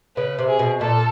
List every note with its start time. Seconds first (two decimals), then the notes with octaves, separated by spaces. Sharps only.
0.17 C#3 B4
0.39 C3
0.49 G#4
0.59 B2
0.81 A#2 A4